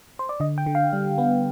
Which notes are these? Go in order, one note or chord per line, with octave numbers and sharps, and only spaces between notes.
C5
D5
D3 D#5
G5
D3
F5
G3
B3